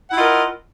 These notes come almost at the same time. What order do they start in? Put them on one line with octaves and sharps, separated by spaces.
F#5 E4 F4 D#5 A#4